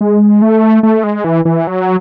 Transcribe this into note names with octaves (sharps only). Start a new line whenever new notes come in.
G#3
A3
A3
G#3
E3
E3
F#3